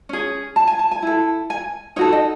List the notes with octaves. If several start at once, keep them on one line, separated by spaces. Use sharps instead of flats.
C#4 G#4
A5
G#5
A5
G#5
E4 A4
G#5
D#4 F#4 A4 C#5
D#5